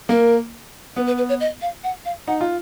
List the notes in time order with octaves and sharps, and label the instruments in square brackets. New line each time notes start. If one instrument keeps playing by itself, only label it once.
[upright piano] A#3 [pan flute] A#4
[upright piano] B3 [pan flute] B4
[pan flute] B4
B4
C#5
D#5
F5
F#5
F5
[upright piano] D#4 [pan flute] F#5
[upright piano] F4